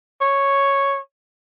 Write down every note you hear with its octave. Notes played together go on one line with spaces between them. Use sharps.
C#5